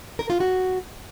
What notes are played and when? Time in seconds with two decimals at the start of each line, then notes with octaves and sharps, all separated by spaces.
0.19 A#4
0.30 F4
0.40 F#4